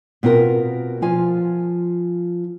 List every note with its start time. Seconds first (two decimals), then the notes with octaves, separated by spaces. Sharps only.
0.23 B2 C4 F4 A#4
1.02 F3 F4 G#5